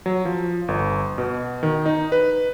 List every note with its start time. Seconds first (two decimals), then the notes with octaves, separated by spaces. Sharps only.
0.06 F#3
0.25 F3
0.68 G1
1.18 B2
1.63 D#3
1.86 D#4
2.12 B4